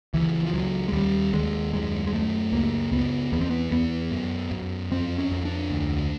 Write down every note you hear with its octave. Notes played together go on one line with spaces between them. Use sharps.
C#2 E3
F3
C#2 F#3
G#3
D#2 G3
D#2 G#3
F#2 G#3
G#3
F#2 A3
C#2 A#3
C#2 B3
E2 B3
C4
B3
E2 B3
F#2
F#2
F2 C4
C#4
F2
D4
D2